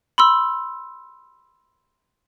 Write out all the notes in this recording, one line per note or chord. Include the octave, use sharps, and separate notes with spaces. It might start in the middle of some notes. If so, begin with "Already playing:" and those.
B5 C6 E6